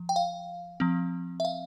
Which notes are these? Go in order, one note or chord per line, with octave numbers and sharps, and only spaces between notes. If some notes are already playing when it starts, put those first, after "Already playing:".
Already playing: F3
G5
F5
F3 C4
E5
F5